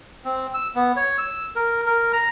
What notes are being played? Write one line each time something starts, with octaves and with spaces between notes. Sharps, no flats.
C4
E6
B3
C#5
E6
A#4
A#4
A#5